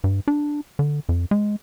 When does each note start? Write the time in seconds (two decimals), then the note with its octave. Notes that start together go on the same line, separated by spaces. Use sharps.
0.04 G2
0.28 D4
0.79 D3
1.09 F2
1.31 G#3